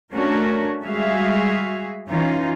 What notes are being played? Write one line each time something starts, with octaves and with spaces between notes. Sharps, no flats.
A3 C#4 D4 F#4 A#4
G3 G#3 F#4 G#4 E5 F5
E3 C#4 D#4 F4